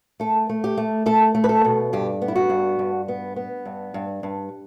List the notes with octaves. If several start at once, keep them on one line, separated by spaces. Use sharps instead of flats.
A3 A4
A3
G4
A3
A3 A4
A3
B4
A4
B2
G2 G4
B3
E4
F#4
G2
G2
B3
B3
G2
G2
G2